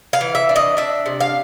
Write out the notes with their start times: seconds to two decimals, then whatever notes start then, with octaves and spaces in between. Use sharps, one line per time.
0.13 F5
0.21 E3
0.35 E5
0.49 D4
0.56 D#5
0.77 D4 E5
1.06 C3
1.20 F5